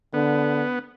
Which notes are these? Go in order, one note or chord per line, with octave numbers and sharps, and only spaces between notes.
D3 B3